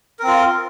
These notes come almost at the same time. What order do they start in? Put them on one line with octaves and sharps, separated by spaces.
A#4 C4 F4